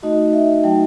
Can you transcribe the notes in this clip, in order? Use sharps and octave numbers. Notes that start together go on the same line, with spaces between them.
A3 D#4 F#4 D#5
E5
F#3 A3 D#4 F#4 G5